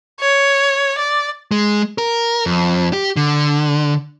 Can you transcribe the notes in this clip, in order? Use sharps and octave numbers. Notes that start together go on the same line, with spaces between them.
C#5
D5
G#3
A#4
F2
G4
D3